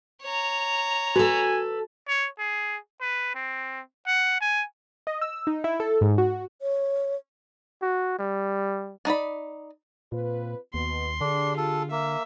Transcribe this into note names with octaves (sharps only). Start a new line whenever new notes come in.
C#5 A#5
F#4 A4 B4 G#5
C#5
G#4
B4
C4
F#5
G#5
D#5
E6
D#4
E4
A4
G#2
F#4
C#5
F#4
G3
D4 D#4 D5 B5
A#2 C4 F4 B4
D#2 B2 B3 C6
D3 D4 G4 G#4
F4 A4
A#3 E5